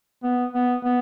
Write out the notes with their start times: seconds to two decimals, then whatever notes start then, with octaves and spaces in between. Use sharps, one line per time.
0.24 B3
0.54 B3
0.84 B3